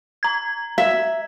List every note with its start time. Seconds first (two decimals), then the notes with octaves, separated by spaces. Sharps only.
0.23 A#5 G#6
0.78 E5